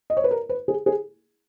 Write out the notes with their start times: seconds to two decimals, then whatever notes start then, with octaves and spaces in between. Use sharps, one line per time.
0.10 D#5
0.17 C#5
0.24 B4
0.31 A#4
0.49 B4
0.68 G#4
0.86 G#4